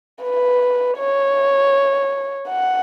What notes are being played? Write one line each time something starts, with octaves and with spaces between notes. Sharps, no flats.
B4
C#5
F#5